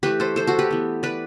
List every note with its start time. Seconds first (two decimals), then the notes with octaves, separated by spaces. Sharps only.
0.03 E3 A3 G4 B4
0.20 A4 C5
0.36 A4 C5
0.47 F#4 A4
0.59 G4 B4
0.71 E3 B3
1.03 B4 D5